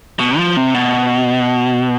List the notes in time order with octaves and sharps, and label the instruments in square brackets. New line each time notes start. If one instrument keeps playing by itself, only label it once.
[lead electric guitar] B2
F3
C3
B2